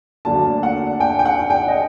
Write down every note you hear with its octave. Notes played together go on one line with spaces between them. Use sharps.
D2 D3 F#3 A#3 D4 A5
F#5
G5
G5
F#5
G5
D#5